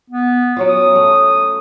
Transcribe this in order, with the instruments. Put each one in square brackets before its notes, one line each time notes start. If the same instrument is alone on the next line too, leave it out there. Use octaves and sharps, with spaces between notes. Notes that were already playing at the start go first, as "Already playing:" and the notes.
[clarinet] B3
[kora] F#3 C#4 F4
[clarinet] D#6
[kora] A3